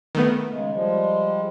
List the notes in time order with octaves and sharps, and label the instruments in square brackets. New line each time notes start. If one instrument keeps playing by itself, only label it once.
[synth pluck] D#3 A3 B3
[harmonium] C#3 G#3
F3 G3 G#3